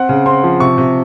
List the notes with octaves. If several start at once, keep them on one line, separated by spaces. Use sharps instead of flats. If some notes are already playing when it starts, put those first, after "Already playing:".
Already playing: C4 F#5
C#3
C4 C6
F3
C3 C#6
C3